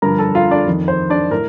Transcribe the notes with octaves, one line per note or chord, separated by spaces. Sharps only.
G2 D3 F3 A#4 A#5
A4 A5
F4 F5
D4 D5
F2 D#3
C5
D4 D5
A2 A#4